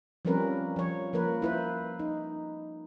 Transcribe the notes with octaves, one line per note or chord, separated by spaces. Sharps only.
F3 G3 C4 C#4 A#4 B4
F3 C#5
F3 A#3 A#4 B4
E4 B4 C5
D#4